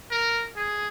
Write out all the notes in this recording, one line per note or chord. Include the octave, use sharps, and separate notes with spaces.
A#4
G#4